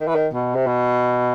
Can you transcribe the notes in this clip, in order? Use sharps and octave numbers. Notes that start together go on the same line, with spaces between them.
D#3
E3
D#3
B2
C3
B2